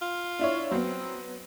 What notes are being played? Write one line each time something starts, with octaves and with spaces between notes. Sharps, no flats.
F4
D4 E4 C#5
F#3 B3 C4